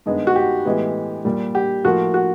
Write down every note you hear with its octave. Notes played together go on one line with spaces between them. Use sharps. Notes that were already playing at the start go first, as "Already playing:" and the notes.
G2 D#3 G#3 B3
F#4
G4
A2 E3 G#3 B3
A#2 G3 A#3
G4
A2 F3 A#3 F#4
F#4